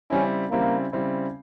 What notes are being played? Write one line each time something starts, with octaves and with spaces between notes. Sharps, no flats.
C#3 G3 C4 C#4 E4
C#3 G3 A#3 C4 E4
C#3 G3 C4 E4